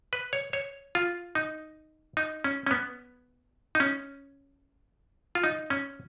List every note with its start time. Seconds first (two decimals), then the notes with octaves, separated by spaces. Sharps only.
0.13 B4
0.33 C#5
0.53 C#5
0.95 F4
1.35 D#4
2.17 D#4
2.44 C#4
2.66 C#4
2.71 B3
3.75 D#4
3.80 C#4
5.35 F4
5.44 D#4
5.70 C#4